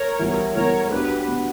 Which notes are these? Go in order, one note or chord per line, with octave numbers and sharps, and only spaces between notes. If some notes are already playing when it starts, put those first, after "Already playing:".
Already playing: A#4 C#5
E3 G3 B3 E4
E3 G3 B3 E4 A#4 C#5
B3 D4 F#4 G4 B4
B3 D4 F#4